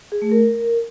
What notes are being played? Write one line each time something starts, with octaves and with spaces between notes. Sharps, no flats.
G#4
A3
A#4